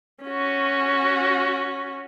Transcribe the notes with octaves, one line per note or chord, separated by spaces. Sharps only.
C#4 F#4